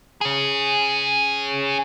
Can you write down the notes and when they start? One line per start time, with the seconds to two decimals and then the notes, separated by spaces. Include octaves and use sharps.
0.21 C#4 G#4